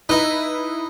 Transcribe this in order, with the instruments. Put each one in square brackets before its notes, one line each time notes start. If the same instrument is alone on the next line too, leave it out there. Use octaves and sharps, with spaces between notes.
[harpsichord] D#4 [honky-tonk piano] E4 B4